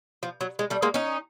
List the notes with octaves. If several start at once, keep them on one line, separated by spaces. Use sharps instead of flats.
F3
F#3
G#3
G3 A3
G#3 A#3
C#4 D#4